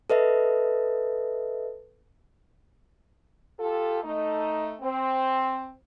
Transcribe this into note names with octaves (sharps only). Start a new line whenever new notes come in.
A4 B4 D#5 E5
F4 G4 A4
A3 D#4
C4